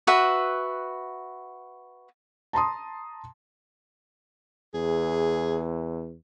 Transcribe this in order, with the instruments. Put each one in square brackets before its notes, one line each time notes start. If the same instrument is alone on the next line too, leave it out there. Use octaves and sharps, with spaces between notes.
[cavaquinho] F#4 B4 E5
[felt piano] A5 A#5 C6 D#6
[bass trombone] E2 [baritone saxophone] G#4